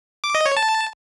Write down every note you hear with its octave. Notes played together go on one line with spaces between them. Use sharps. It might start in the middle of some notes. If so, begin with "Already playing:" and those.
D6
D#5
C#5
A5